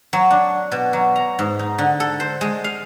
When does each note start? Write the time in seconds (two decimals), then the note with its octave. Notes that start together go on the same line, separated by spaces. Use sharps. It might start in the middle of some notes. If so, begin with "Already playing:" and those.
0.13 F#3
0.30 D4
0.72 B2
0.93 F#3
1.16 A#5
1.39 G#2
1.59 D#4
1.78 D3
2.00 A4
2.20 C5
2.41 G#3
2.64 F5